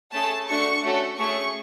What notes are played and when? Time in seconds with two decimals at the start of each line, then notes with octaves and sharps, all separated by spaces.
0.13 A3 C#4 G#4 A5
0.48 A3 D4 F#4 A4 C#6
0.82 A3 C#4 F#4 A4
1.18 A3 C#4 G#4 C#6